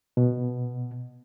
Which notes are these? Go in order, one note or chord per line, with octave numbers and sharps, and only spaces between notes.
B2